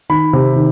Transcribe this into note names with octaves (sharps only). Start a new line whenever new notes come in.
D#3 B5
C3
D#3